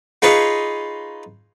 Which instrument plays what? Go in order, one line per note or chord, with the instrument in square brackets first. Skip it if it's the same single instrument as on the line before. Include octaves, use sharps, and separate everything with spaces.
[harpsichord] D#4 F4 G#4 B4 C#5 D#5